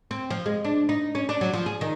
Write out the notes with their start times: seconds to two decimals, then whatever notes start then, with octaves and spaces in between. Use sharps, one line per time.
0.11 C4
0.31 F3
0.46 G#3
0.65 D4
0.89 D#4
1.15 C#4
1.29 D4
1.41 F#3
1.53 F3
1.66 G#4
1.81 D#3